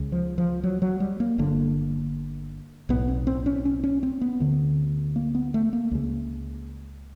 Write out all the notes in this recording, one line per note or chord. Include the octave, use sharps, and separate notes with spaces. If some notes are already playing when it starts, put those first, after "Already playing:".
Already playing: C#2 C#3
F3
F3
F#3
F#3
G3
A#3
G1 G2 D3 A#3
B1 A2 B3
C4
C4
C#4
C#4
C#4
C4
B3
D2 D3
A#3
B3
A3
A#3
C#2 C#3